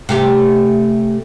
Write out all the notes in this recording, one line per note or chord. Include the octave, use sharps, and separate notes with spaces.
C3 A3 G4